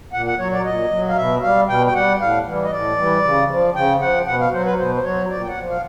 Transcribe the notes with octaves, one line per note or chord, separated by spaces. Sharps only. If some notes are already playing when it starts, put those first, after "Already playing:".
A#2 F#5
F#5
F#3 C#5
D5
A#2 D#5
F#3
F5
B2 E5
G3 F5
B2 G5
G5
G3 F#5
A2 F5
E3 G3
D#5
A2 D5
E3 G3
C#3
F3
C#3 G5
F3 F#5
B2 F#5
F5
F#3 C5
B4
B2 C5
C5
F#3 C#5
A#2 D5
G5
F#5
F3
F5